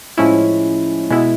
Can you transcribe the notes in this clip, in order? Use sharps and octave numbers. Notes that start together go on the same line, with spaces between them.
A2 F3 G#3 C#4 E4
B2 G#3 B3 E4